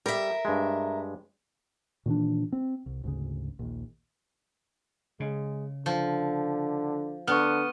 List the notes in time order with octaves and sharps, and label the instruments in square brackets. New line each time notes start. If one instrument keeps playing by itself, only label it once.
[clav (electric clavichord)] G3 [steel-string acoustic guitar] A#4 E5
[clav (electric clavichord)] G2 G#3
[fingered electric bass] A#2 D#3 E3 D4
C4
C2
G#1 D2 C#3
A#1 D#2
[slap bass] C#3 [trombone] G#3
[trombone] D3 [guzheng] F3
[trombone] D3 [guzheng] B3 [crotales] C#6 F6